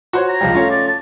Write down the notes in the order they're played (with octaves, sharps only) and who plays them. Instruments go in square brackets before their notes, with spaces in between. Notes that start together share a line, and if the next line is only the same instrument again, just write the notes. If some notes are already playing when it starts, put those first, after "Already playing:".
[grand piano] F#4 C5 C#5
[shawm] A#5
[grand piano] C#2 F3 G3
A3 C#4 F4
[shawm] D5
A5